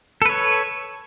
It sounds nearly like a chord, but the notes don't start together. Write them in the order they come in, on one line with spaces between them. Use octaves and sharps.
A4 B4 C#5